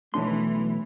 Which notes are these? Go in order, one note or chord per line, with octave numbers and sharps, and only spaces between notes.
B1 E3 A3 D4 C6